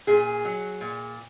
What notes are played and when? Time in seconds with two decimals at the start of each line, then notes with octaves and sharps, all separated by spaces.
0.07 A#2 G#4
0.45 F#3
0.81 A#2